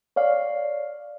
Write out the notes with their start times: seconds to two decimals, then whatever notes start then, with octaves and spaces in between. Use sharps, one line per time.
0.16 C#5 D5 F5